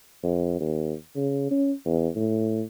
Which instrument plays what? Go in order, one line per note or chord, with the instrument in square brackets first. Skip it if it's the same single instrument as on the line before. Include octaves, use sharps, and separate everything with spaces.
[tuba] F2
D#2
C#3
C#4
E2
A2